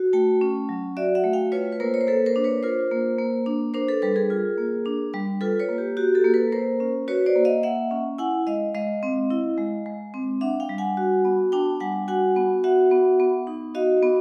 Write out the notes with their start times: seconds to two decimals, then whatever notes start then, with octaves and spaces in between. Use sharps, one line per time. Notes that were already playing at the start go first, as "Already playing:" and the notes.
Already playing: F#4
0.13 A3 G5 A5
0.41 C#4
0.69 F#3
0.97 F#4 D5 E5
1.15 E5 F#5
1.24 A3
1.33 F5 G5
1.52 F4 B4 C#5
1.72 B4
1.80 A#3 A#4 C5
1.94 C#5
2.01 C5
2.07 A#3 A4 B4
2.26 A#4 C5
2.36 D4
2.44 B4 C#5
2.63 F4 A#4 C5
2.91 A#3
3.19 A#3
3.46 D4
3.74 D4 A#4 C5
3.89 A4 B4
4.02 G3 A4 B4
4.16 G#4 A#4
4.30 F4
4.58 A#3
4.86 D4
5.14 G3
5.41 F4 A4 B4
5.60 B4 C#5
5.69 A#3
5.78 G4
5.97 F#4 G4
6.15 G4 A4
6.24 A#3
6.34 A4 B4
6.52 A#3 A#4 C5
6.80 C#4
7.08 F#4 B4 C#5
7.26 C5 D5
7.36 A#3
7.45 D#5 F5
7.63 A#3 E5 F#5
7.91 C#4
8.18 E4 F#5 G#5
8.47 G#3 D#5 F5
8.74 G#3 D#5 F5
9.03 C4
9.30 E4
9.58 G#3
9.86 G#3
10.14 C4
10.41 D4 E5 F#5
10.60 F5 G5
10.69 G3
10.78 F#5 G#5
10.97 F#4
11.25 B3
11.52 D4 G5 A5
11.80 G3 F#5 G#5
12.08 F#4 F#5 G#5
12.36 B3
12.64 F#4 E5 F#5
12.91 B3
13.20 B3
13.47 D#4
13.75 F#4 D#5 F5
14.03 B3